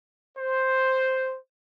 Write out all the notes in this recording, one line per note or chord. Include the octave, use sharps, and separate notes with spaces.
C5